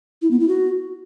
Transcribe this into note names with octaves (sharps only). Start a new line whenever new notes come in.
E4
B3
E4
F#4